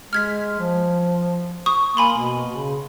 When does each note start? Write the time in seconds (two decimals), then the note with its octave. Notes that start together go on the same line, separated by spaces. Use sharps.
0.13 G#3 F6 G#6 B6
0.59 F3
1.66 C#6 D#6
1.97 A#3 G#5 B5 C6
2.18 B2
2.51 C#3